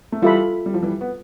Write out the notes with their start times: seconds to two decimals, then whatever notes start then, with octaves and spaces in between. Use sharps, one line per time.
0.12 A3
0.22 E3 G3 F4 A4 E5 B5
0.66 G3
0.74 F3
0.83 E3 G3
1.01 B3